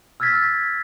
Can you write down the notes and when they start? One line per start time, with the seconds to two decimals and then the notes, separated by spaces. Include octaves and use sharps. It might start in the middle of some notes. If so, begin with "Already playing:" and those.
0.20 E6 F6 G#6 A6 B6